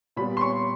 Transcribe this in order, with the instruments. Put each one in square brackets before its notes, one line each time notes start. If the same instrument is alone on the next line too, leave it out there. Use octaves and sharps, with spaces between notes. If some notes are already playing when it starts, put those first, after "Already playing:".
[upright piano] A#2 G3 B3 B5
C6
C#6